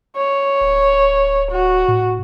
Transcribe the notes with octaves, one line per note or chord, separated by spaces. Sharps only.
C#5
D1
F#4
A2